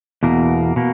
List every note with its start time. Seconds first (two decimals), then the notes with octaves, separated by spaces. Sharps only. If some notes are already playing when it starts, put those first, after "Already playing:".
0.23 E2 B2 A#3
0.76 B2 A#3